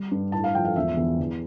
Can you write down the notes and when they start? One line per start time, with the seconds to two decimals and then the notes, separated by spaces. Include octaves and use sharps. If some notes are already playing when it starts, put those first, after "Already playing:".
Already playing: G3
0.11 G2
0.32 A2 A5
0.44 F5
0.55 F3 G5
0.65 F5
0.76 E1 E5
0.97 E2
1.20 E2